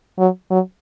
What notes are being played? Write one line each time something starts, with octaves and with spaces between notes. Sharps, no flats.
F#3
F#3